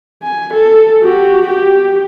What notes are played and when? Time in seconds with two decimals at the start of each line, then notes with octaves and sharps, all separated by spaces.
0.23 G#5
0.54 A4
1.02 F#4 G4
1.47 G4